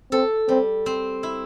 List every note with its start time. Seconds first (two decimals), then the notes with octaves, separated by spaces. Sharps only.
0.12 C4 A4
0.48 G3 C4
0.86 C4
1.23 E4